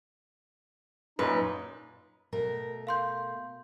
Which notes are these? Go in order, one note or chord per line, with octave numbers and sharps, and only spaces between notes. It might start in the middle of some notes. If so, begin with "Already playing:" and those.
F#2 A#2 D#4 B4
B2 A3 A#4
F5 C6 G6